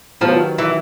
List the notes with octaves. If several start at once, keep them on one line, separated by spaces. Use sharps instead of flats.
D#3 F3 F#3 B3 D#4 G4
E3